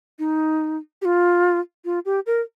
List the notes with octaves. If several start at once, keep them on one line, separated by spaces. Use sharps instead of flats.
D#4
G4
F4
F4
G4
A#4